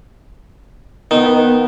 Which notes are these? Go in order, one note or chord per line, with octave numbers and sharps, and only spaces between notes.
D#3 B3